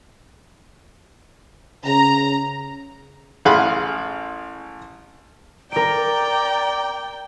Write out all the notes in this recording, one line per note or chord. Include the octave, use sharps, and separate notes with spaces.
C#3 A#5
A1 G#4 F5 F#5 B5 C6
A#4 D5 G5 A#5 D7